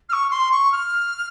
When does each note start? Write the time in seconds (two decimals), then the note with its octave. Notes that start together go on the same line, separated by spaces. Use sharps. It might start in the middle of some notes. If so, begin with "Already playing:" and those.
0.09 F6
0.12 C#6
0.30 C6
0.51 C#6
0.72 F6